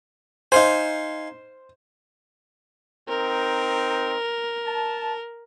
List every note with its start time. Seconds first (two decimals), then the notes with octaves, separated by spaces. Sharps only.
0.52 D#4 C5 F5 G#5
3.08 C4 D#4 A#4
4.65 A5